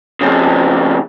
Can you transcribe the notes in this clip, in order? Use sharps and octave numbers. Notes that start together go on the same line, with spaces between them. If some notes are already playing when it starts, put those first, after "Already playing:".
F2 C#3